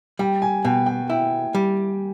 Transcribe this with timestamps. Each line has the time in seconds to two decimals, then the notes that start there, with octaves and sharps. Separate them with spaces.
0.19 G3 G5
0.42 G#5
0.65 B2 G5
0.86 G5
1.10 E4 G5
1.55 G3